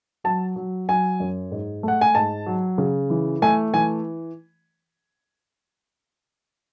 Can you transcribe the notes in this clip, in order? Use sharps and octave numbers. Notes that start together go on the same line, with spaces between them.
F#3 A5
F#3
F#3 G#5
F#2
G#2
A3 F#5
G#5
G#2 A5
F#3
C#3
E3
A3 G#5
E3 G#5